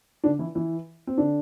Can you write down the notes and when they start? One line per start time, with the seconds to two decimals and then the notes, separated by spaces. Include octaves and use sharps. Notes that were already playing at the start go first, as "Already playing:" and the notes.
0.24 D3 D4
0.39 E3 E4
0.55 E3 E4
1.07 C4
1.18 D3 D4